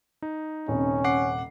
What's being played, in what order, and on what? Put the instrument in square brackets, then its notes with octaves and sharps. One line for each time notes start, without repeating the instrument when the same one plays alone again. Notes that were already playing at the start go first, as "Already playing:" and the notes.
[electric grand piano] D#4
[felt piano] D#1 C3 [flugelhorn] C#4
[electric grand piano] F#5 D6 C7